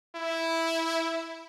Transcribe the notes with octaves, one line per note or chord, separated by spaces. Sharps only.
E4